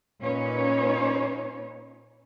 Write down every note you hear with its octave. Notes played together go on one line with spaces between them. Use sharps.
A#2 C#4 D#4 B4 C#5